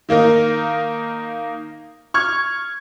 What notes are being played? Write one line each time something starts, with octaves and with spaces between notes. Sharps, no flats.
D#3 A#3 D#4 A#4
C#6 F6 G#6